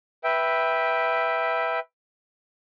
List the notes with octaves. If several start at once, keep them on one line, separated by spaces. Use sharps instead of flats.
B4 E5 G5